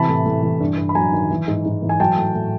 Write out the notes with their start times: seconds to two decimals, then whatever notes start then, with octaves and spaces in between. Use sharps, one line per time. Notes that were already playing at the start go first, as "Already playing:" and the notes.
Already playing: C3 E3 A5 B5
0.08 A2
0.26 A2
0.42 E3
0.60 G2
0.78 G2
0.89 B5
0.95 F#3 G#5 A#5
1.12 D#3
1.30 E3
1.48 G#2
1.65 G#2
1.82 E3
1.89 G#5
2.00 F#3 G5 A5
2.17 A2
2.35 A2